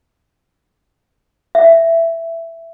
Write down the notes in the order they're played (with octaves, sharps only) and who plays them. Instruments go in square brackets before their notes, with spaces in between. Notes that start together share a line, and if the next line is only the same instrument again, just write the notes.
[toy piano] E5